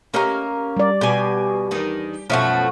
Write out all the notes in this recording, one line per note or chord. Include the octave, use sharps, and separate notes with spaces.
A#3 C#4 G4 A#4 D#5
G3 D5
B2 G4 G#5
E2 D#3 D4
F#2 B2 F3 A3 C#4 F#4